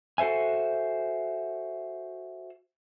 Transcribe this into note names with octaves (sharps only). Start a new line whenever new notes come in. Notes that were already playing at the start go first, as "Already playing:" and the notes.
F#4 A4 C5 E5 G#5